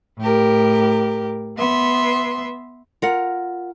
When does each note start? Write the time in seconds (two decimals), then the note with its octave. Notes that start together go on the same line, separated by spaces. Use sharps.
0.18 A2 G4 A#4
1.56 B3 E5 C6
3.02 F4 A#4 F#5